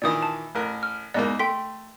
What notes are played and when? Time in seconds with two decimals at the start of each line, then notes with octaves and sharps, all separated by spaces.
0.02 A#2 D#3 E3 D5 D#6
0.23 A5
0.55 A1 A#4
0.83 F6
1.14 E2 G#2 A#3 D5 D#5
1.39 A3 G5 C6 B6